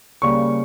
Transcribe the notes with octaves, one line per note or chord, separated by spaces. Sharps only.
C#3 G3 A#3 C#6